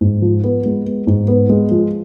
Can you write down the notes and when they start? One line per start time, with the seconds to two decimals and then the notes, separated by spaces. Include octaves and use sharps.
0.01 G#2
0.22 F3
0.44 B3
0.65 G#3
0.85 B3
1.07 G#2
1.28 B3
1.49 G#3
1.71 F3